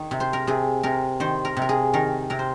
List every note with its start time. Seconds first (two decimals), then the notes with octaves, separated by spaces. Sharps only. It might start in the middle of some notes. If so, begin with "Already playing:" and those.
Already playing: D#3
0.11 C3
0.20 C5
0.33 A#4
0.47 C3 G#4
0.83 C3 A#4
1.20 D#3 C5
1.45 A#4
1.57 C3
1.62 A#4
1.69 G#4
1.94 D#3 A#4
2.30 C3 A#4
2.39 C5